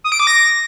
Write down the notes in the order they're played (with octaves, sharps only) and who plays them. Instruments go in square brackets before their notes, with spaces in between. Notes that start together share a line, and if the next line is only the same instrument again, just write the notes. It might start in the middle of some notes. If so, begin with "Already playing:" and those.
[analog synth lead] D#6
D7
D6
A#6